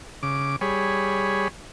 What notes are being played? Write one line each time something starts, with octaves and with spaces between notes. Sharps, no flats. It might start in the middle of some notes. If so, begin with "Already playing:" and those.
C#3 D6
G3 G#4 C#5 B5